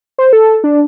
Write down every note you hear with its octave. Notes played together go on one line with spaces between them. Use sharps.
C5
A4
D4